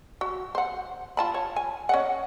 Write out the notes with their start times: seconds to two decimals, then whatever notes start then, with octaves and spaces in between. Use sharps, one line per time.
0.21 F#4
0.55 C5 F#5
1.17 F4 A5 B5
1.34 C#5
1.56 G#5
1.89 C#4 D#5 F#5